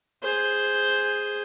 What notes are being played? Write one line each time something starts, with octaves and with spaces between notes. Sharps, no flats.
G#4 C5